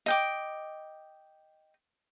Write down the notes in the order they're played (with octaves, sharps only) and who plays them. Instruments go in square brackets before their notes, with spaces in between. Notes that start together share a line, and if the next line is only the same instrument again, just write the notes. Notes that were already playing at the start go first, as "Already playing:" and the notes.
[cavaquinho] D#5 G5 D6